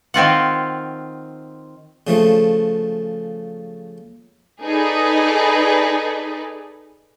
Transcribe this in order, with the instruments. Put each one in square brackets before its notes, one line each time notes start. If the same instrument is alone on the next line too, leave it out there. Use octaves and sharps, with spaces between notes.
[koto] D#3 C4 F4 F#5
[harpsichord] C#3 F3 A3
[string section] D#4 G#4 A4 B4 D5